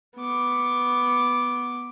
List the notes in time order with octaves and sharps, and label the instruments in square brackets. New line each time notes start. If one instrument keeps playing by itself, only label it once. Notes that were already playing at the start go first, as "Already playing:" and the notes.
[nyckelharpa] B3 D6